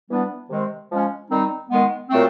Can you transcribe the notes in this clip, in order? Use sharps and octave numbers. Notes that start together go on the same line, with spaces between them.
E3 G3 B3 D4
C3 D#3 G#3 C4
F3 G#3 C#4
D#3 G3 C4 D#4
D#3 G#3 B3
A#2 F#3 A3 C4